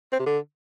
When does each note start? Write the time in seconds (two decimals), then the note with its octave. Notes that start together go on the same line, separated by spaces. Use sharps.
0.13 C4
0.19 C3
0.26 D3